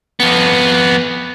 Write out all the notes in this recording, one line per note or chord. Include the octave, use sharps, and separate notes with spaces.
F2 B3